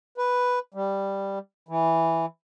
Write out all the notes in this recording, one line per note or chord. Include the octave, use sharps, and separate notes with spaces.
B4
G3
E3